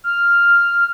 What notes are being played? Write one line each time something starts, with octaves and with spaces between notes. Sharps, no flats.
F6